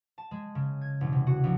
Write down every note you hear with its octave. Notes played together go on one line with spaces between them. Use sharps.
A5
G#3
C#3
G#6
E1
C3
F#4
A#1